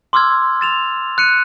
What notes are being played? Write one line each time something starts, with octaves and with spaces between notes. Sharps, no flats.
C6 D6 E6 F6 G#6
A6 E7 F7
F#6 C#7 D#7